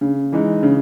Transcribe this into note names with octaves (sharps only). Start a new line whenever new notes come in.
C#3
E3 G#3 D#4
C#3